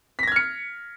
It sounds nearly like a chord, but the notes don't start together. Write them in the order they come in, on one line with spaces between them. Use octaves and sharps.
B6 A#6 G#6 F6 C#7